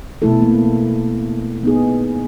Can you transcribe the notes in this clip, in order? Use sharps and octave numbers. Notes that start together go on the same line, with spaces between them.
B2 A3 E4 A4
A#3
B3 D#4 G#4